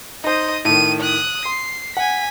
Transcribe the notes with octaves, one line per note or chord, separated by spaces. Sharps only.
D#4 C5 D#5 D#6
A2 D#3 D#7
D#6 F#6
C6 C7
F#5 G#5 B6